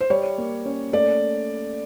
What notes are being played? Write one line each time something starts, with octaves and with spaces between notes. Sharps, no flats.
C5
G3 C#5
A#3
C#4
A3 D5